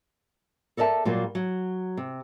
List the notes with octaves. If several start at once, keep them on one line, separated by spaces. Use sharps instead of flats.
A4 A#4 D5 E5 A5
A#2 F#3 G3 A#3
F#3
C3